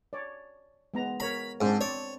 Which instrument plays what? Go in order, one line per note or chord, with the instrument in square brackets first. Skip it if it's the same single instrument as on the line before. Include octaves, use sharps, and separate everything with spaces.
[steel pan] C#5 D5
G#3 B3 A#5
[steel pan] A#4 C#5 A#5 [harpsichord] B5
[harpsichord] G#2 [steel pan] C4 D4 C5
[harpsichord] C#5 [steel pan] D5